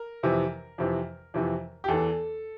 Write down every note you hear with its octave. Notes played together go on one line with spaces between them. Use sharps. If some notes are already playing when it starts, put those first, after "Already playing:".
Already playing: A#4
F2 C3 E3
F2 C3 E3
F2 C3 E3
G4
E2 E3 A4